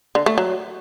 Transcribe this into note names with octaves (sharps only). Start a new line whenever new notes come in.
D3
A3
F#3